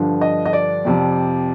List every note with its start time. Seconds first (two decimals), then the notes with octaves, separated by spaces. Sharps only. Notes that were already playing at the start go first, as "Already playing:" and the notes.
Already playing: G2 D3 F3
0.21 D#5
0.46 D#5
0.53 D5
0.85 F2 C3 F3